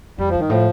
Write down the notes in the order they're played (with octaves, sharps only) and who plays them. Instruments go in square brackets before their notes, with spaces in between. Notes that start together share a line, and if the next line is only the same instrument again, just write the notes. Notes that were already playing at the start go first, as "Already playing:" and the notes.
[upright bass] F2 [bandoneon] G3
[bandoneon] F3
[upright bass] G2
[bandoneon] D#3
[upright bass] A2 [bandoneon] F3